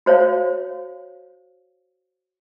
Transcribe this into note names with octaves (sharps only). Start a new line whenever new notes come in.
F#4 C5 C#5 F5